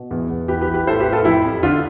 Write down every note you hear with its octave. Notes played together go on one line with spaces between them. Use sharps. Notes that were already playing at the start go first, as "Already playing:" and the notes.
Already playing: B2
E2
E2
E3 G4 B4
G4 B4
E3
G4 B4
A2 A4 C5
G4 B4
A2
F4 A4
F2 E4 G4
F2
D3 D4 F4